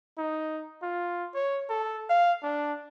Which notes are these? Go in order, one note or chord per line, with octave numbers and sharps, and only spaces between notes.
D#4
F4
C#5
A4
F5
D4